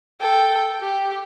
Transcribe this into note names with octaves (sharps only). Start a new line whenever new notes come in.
A4 G5
G4